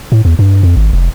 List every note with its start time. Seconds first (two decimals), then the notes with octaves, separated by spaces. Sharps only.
0.12 A2
0.25 E2
0.39 G2
0.63 F2
0.77 G#1
0.93 F1